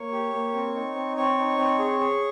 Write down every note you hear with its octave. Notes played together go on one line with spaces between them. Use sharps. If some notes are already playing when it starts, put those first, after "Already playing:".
Already playing: A#3 C#5 C#6
G4
A#3
C4
D#4
C4
C4 C#5 C#6
D#4
C4
G#4
G#4